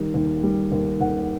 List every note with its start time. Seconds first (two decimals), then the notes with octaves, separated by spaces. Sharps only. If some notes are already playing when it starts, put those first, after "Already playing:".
Already playing: D#3 G3
0.14 D#2
0.43 G3
0.72 D#2
1.00 D#2 F#5